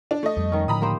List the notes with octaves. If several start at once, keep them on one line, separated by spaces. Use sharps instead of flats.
D4
A3 D#5
F2 G3
D#3 C#4
A2 D3 F3 A#5 B5 D#6
A#3 G4 C5